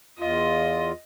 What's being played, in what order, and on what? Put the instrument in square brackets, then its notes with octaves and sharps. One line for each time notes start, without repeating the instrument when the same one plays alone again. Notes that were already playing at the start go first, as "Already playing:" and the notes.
[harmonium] E2 F4 [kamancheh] D#5